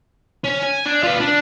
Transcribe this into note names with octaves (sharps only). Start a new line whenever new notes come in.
C#4
G#5
D4
F4 B4
D4